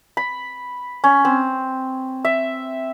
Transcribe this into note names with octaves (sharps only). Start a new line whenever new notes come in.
B5
C#4
C4
E5